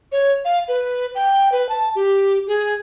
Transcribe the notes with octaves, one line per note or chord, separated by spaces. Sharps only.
C#5
F5
B4
G5
B4
A5
G4
G#4